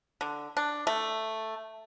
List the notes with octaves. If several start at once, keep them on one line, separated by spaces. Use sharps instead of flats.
D3
D4
A3